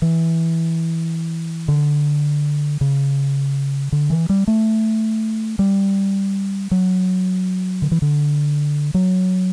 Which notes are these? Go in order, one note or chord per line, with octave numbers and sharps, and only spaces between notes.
E3
D3
C#3
D3
E3
G3
A3
G3
F#3
D3
E3
D3
F#3